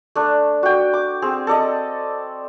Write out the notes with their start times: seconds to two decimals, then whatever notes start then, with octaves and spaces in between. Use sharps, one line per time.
0.15 A3 D4
0.63 F#4 G5
0.93 D6
1.22 C4 G#4
1.47 A4 D5 D#5